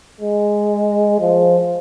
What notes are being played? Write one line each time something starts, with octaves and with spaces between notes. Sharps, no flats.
G#3
F3